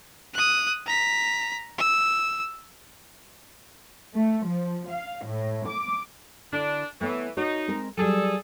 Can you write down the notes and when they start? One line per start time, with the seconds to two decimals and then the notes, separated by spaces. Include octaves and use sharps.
0.34 D#6 F#6
0.86 A#5 B6
1.78 E6
4.16 A3
4.47 F3
4.90 F5
5.27 A2
5.67 D6
6.52 D3 D4 E4
7.01 E3 A3 B3 C#5
7.37 D#4 F#4 A#4 C#5
7.68 G#3 C4 A#4
7.97 F#3 G3 G#4 A4